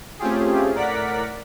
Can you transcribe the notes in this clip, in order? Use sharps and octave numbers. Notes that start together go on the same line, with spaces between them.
A3 C4 C#4 F4 G4 G#4
A2 A#4 D5 F#5 B6